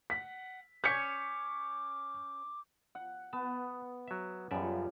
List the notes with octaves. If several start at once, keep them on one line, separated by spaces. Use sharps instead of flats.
F#5 B6
C#4 C#5 D6 G6 B6 C#7
F#5
B3 A5
F#3 E5
F#2 C#3 F3 G3 D5 E5